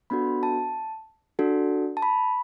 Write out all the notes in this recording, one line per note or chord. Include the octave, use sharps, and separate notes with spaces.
B3 D4 F#4 A4 B5
A5
D4 F#4 A4
A5
B5